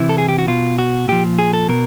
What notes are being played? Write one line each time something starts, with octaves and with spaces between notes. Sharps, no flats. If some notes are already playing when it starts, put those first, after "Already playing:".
Already playing: C3 E3 E4
A4
G#4
G4
F#4
B2 F4
F#4
A#2 F3 G4
G#4
A4
B2 A#4